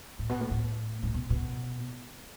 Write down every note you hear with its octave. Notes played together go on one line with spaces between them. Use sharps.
A2
B2
A2
A2
A2
B2
B2